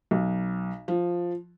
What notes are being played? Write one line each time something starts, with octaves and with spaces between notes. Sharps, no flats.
B1
F3